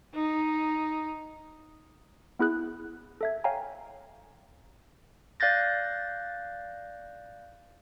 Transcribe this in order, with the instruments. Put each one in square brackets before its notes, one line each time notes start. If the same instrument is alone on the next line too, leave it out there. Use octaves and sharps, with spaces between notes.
[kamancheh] D#4
[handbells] B3 E4 G#4 F#6
A4 E5 G#6
C#5 F5 G5 G#5 A#5
D5 F5 F#6 G6 A6 A#6